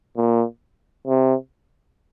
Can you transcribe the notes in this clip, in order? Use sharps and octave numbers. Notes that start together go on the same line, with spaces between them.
A#2
C3